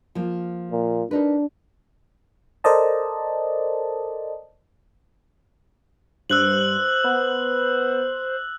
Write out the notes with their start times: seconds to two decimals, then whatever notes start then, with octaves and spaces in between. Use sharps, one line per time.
0.15 F3 A#3
0.71 A#2
1.11 D4 D#4 A#4 B4
2.64 A4 A#4 C5 D5 D#5 A5
6.30 G2 C5 E6 F#6 F#7
7.04 B3